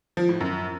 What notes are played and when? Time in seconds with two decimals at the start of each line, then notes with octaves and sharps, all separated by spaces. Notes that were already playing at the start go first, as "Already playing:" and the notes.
0.17 F3
0.29 A2
0.40 F#2